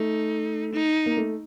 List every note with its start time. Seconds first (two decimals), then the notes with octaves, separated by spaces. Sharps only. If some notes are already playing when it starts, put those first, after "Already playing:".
Already playing: A3 D#4
0.73 D#4
1.06 A#3
1.17 A3